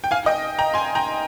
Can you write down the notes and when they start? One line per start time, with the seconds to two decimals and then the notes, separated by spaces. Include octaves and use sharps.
0.04 G5
0.11 F5 G#5
0.26 D#5 G5
0.58 G5 A#5
0.74 G#5 C6
0.95 G5 A#5